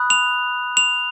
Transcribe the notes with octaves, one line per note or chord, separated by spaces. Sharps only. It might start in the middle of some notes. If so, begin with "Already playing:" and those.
Already playing: B5 D#6 F#6
F7
F7